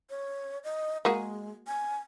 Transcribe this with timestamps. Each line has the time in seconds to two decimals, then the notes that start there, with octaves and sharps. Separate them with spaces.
0.10 C#5
0.64 D#5
1.05 G#3 A#3 F#4 G#4
1.67 G#5